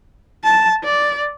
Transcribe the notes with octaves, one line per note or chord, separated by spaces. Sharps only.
A5
D5